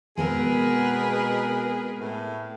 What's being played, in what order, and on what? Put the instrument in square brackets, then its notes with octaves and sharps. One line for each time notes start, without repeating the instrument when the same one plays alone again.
[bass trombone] B2 [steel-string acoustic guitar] G#3 B3 C4 [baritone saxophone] G#4 [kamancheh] A#4 B4
[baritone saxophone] A2